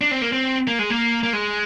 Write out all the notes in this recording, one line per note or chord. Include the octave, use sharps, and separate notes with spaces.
D4
C4
A#3
C4
A#3
G#3
A#3
A#3
G#3